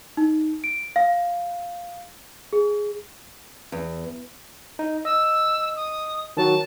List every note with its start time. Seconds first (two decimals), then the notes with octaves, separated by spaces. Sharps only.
0.17 D#4
0.64 D7
0.96 F5
2.53 G#4
3.72 E2
4.79 D#4
5.05 D#5 E6
5.76 D#6
6.37 D#3 F#3 F#4 A5